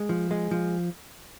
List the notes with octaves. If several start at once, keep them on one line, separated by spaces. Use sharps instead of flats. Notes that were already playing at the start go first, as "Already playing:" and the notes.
Already playing: G#3
F3
G#3
F3